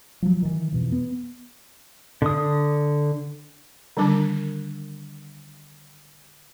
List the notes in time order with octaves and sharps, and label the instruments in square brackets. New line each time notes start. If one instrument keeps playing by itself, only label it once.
[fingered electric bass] F3 F#3
D#3 E3
F2 B2 E3
B3
[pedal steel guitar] D3 D#6
[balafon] D3 D#3 G3 D4 D6